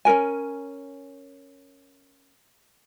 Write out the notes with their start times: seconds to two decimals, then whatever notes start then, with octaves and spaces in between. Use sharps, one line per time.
0.05 C#4 D4 A#4 G#5